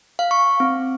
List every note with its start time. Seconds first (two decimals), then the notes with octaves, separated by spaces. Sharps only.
0.19 F5
0.31 C#6
0.60 C4